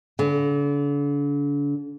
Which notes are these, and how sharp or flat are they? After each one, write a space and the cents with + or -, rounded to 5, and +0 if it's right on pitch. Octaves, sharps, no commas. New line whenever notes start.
D3 -40